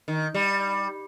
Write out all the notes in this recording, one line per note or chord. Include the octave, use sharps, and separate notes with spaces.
D#3
G3